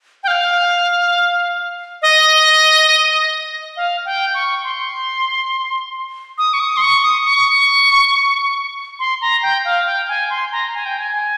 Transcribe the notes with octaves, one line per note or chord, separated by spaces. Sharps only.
G5
F5
D#5
F5
G5
C#6
C6
D#6
C#6
D#6
C6
C#6
D#6
C#6
C6
A#5
G5
F5
G5
G#5
C6
A#5
G#5
G5
G#5